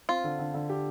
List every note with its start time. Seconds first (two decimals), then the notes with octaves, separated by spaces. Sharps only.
0.09 C4 F4
0.24 D3
0.39 D3
0.54 D3
0.69 G4